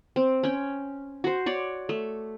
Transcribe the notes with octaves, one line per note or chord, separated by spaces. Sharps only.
C4
C#4 G5
F#4 C5
C#5 D5
A3